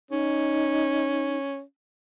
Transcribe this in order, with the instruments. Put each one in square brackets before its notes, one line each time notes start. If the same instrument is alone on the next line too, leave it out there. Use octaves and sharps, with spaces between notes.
[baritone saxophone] C#4 [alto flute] D#4